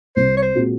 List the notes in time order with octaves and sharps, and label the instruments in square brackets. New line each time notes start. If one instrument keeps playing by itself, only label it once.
[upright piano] C2 [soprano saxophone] C5
[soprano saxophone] C#5
C5
[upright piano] A#2 G#3 C4 F#4